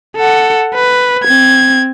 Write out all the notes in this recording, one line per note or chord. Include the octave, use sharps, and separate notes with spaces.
A4 F#5
B4
C4 G#6